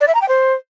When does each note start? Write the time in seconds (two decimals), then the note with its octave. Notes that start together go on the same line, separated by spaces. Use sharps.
0.01 D5
0.08 E5
0.15 A#5
0.22 G5
0.28 C5